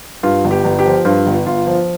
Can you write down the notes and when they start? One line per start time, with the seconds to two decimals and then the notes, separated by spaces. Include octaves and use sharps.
0.23 G2 F4
0.44 G1
0.51 G4
0.65 G1
0.79 G4
0.86 F3
1.05 G2 F4
1.26 G1
1.46 G1 F4
1.67 F3